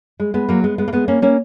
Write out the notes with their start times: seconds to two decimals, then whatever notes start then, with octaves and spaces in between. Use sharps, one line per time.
0.20 G#3
0.34 G#3 B3
0.49 F#3 A#3
0.64 G#3 B3
0.78 G#3 B3
0.88 A#3
0.93 G#3 B3
1.08 A#3 C#4
1.22 A#3 C#4